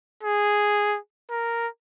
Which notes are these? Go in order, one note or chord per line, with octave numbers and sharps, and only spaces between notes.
G#4
A#4